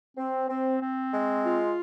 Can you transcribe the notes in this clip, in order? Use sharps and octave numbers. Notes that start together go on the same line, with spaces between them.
C4
C4
C4
G#3
F4